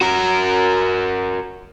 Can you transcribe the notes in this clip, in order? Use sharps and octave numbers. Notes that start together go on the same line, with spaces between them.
F#4 A#4